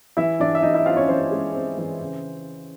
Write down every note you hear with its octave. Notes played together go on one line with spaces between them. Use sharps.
E3 E4 E5
E3 D4 D5
E5
E3 D#4 D#5
E4 E5
C4 F4 F5
C#4 C#5
E3 C5
G#3
C4
E3
C#3